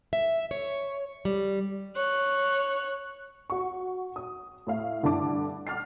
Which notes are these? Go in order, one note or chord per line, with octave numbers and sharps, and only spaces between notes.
E5
C#5
G3
C#5 F#6
F#4 C#6
D#6
A2 E4 E5 F5
G2 D3 E4 A5 D6
F#5 D6 F6 A6 C7